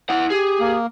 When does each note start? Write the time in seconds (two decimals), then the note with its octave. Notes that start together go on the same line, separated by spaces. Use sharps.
0.09 E4 F#5
0.30 G4 G#4
0.60 A#3